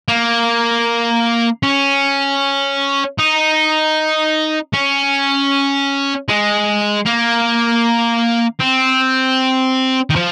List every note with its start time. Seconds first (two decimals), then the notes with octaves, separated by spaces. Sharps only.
0.08 A#3
1.63 C#4
3.18 D#4
4.74 C#4
6.28 G#3
7.06 A#3
8.60 C4
10.10 D#3
10.16 F3